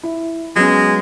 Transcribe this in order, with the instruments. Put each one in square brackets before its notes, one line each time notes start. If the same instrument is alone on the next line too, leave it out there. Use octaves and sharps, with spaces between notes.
[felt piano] E4
[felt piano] F#3 B3 C#4 [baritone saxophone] G#3